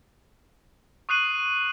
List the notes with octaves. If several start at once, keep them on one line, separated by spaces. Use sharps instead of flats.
C#6 D#6 F#6 C7 D#7 F#7